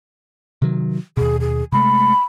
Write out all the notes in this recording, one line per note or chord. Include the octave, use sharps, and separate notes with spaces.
C3 D#3 F#3
D#2 B2 G#4
G#4
C3 G#3 A3 B5